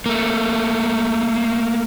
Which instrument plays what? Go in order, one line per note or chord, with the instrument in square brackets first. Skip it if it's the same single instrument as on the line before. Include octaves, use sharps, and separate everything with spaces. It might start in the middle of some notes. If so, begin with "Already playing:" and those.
[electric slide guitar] A3 A#3